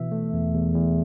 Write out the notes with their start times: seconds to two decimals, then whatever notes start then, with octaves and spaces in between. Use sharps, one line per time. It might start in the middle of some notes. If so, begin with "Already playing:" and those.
Already playing: B2 E3 E5
0.12 A3
0.33 E2
0.54 E2
0.75 E2